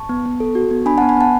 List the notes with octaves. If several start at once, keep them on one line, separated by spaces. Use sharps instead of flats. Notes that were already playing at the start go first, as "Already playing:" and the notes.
Already playing: A5 C#6
B3
B3
A4
F#4
B3
D4 G#5 B5
B3 F#5 A5
G#5 B5
B3 F#5 A5